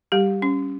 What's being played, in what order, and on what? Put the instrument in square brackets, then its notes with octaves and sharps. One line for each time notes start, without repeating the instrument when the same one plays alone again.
[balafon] G3 G4
C#4